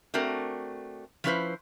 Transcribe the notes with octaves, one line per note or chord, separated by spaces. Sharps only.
A3 C4 D4 F#4 A#4
F3 F#3 C#4 E4 B4 C5